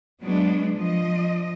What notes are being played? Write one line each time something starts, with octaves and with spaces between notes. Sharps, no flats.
F#3 G#3 B3 D4
F3 D#5